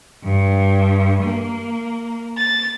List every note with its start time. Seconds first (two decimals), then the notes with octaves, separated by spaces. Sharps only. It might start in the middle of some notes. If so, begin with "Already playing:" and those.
0.23 G2
1.21 A#3
2.37 A6